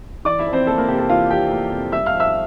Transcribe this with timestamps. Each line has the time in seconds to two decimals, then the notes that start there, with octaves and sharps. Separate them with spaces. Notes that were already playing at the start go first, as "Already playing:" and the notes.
0.25 E3 D5 D6
0.39 E4 E5
0.46 F2
0.53 C4 C5
0.67 A#3 A4
0.78 A#3 A#4
0.88 C3 G4
0.99 A4
1.09 E3 F4 F5
1.30 F2 G4 G5
1.51 A#3
1.72 C3
1.92 G3 E5 E6
2.06 F5 F6
2.14 F2
2.20 E5 E6